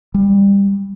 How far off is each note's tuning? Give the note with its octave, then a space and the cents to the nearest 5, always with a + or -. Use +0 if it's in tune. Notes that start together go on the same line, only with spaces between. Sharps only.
G3 +25